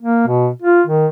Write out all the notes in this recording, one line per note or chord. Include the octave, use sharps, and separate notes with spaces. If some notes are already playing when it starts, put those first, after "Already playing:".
A#3
B2
F4
D#3